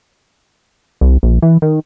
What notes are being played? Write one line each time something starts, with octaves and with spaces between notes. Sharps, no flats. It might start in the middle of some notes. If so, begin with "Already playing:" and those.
C2
A#1
E3
D#3